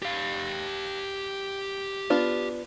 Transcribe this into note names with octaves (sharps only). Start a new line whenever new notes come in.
G4 F5
B3 D4 F4